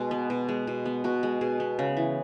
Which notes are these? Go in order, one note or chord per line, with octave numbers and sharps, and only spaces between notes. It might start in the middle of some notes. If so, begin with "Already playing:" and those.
Already playing: B2 G#3
B3
B2
G#3
B2
B3
B2 F#4
G#3
B2 G#4
B3
C#3
E3